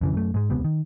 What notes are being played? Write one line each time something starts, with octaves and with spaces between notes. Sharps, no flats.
F2 C#3 E3
F#2 A3
G#2 G#3
E1 C#2 C3 B3
D#3